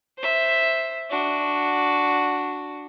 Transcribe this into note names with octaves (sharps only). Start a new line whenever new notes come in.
C5 E5
D4 F#4